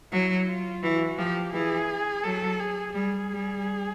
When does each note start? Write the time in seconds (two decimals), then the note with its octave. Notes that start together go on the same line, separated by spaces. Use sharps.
0.12 F#3 E4
0.48 F4
0.83 E3 F#4
1.18 F3 G4
1.53 E3 G#4
2.24 F#3 A4
2.60 G#4
2.95 G3 G#4
3.30 G3